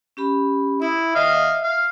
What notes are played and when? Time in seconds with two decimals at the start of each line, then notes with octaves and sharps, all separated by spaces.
0.17 C#4 G4 B5
0.82 E4 E5 D#6
1.15 D#5 F5
1.62 F5